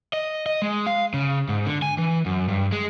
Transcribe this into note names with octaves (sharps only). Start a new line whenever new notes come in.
D#5
D#5
G#3
F5
C#3
G#2
D3
G#5
E3
F#2
G2
G#3